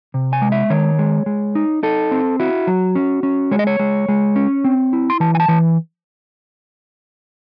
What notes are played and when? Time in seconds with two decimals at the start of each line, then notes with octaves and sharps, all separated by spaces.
0.14 C3
0.33 G#5
0.42 G#3
0.52 E5
0.70 D#3 C#5
0.99 G#3
1.26 G#3
1.55 D#4
1.83 D#4 A4
2.11 C4
2.40 E4 F#4
2.67 F#3
2.95 C#4
3.23 C#4
3.51 G#3 C#5
3.59 D#5
3.67 C#5
3.79 G#3
4.09 G#3
4.36 C#4
4.64 C4
4.93 E4
5.10 C6
5.20 E3 A5
5.35 G#5
5.40 A5
5.48 E3